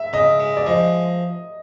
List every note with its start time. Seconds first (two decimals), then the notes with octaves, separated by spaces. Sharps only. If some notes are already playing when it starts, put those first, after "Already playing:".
Already playing: E5
0.13 C#3 D#5
0.40 G#3
0.57 D5
0.66 F3 D#5